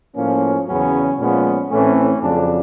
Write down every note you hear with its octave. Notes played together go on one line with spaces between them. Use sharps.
A2 F3 A#3 C#4
E2 C#3 F#3 B3 C#4
A#2 F3 G#3 B3 C#4
A2 E3 A3 C4 C#4
F2 C#3 F#3 D4